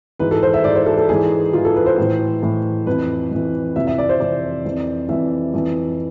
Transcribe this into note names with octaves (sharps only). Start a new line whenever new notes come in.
G#2 E3 B4
A4
C5
E5
G#2 E3 D5
C5
A4
A4
G#2 E3 G#4
G#2 E3 F4
A4
B4
C5
A2 E3
A2 E3
F2 E3 B4
F2 E3
F2 C3 E3 E5
E5
D5
C5
F2 C3 E3 D5
F2 E3
F2 E3 E5
F2 E3